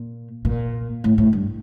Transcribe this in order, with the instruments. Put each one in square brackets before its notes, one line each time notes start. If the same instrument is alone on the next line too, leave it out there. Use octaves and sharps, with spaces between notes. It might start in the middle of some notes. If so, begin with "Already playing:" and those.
Already playing: [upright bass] A#2
A#2
A2
A2
G2